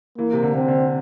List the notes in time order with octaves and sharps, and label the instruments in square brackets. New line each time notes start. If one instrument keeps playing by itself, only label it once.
[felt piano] E3 [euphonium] A#3
[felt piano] C3
D3
[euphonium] C4
[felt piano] D3